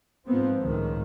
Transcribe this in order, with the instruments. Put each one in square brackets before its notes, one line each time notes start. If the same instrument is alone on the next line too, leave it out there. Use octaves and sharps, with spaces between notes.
[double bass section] G#2 F3 B3 C4
C#2 A2 D#3